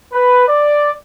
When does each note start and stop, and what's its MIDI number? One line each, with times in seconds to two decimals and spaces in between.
0.12 0.44 71
0.47 0.89 74